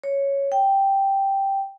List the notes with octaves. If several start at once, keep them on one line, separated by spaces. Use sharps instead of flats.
C#5
G5